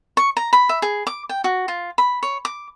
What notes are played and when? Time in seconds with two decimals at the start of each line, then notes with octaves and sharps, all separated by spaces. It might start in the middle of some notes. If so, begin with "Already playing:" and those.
0.17 C#6
0.37 A#5
0.53 B5
0.69 E5
0.82 G#4
1.07 D6
1.29 G5
1.44 F#4
1.68 F4
1.98 B5
2.23 C#5
2.45 D6